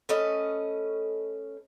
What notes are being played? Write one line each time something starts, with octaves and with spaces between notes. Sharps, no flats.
A3 C#4 B4 D#5